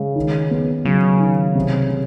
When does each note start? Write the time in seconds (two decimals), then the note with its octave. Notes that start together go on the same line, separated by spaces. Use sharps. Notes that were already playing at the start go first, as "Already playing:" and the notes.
Already playing: C#3 G#3
0.16 D#3
0.51 B3
0.85 C#3 F#3
1.20 D#3
1.55 C3
1.90 C3